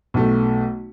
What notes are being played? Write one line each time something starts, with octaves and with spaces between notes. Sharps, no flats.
B1 A3